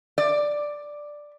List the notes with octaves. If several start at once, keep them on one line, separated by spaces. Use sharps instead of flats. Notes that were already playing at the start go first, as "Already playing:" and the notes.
D5